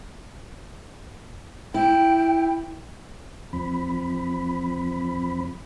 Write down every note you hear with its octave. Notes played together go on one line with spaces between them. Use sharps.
E4 G5
E2 F3 C4 B5